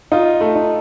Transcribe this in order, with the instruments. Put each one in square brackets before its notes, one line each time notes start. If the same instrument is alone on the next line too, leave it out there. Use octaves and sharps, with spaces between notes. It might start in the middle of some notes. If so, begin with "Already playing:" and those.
[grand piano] D#4 [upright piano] F4
[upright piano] A3
[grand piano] D#4